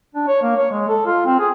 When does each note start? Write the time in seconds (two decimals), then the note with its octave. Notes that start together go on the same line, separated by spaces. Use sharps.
0.15 D4
0.27 C#5
0.42 A#3
0.57 C#5
0.72 G#3
0.89 A4
1.06 F4
1.26 C4
1.39 G#4